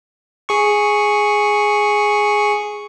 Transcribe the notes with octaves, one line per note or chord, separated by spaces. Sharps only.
G#4 C#6